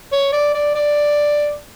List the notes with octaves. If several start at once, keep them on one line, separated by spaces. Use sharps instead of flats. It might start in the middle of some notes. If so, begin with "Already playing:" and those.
C#5
D5
D5
D5